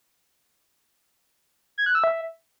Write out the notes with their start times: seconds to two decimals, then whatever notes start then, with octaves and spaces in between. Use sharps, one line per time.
1.78 G#6
1.86 F#6
1.95 E6
2.04 E5